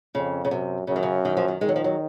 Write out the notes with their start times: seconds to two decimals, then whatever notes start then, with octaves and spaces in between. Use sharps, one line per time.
0.15 F2 C#3
0.45 C#3
0.51 F#2 C3
0.87 F#2 C#3
0.96 D#3
1.03 C#3
1.25 D#3
1.37 F3
1.48 D#3
1.61 D#3 G#3
1.69 F#3
1.76 F3
1.84 F#3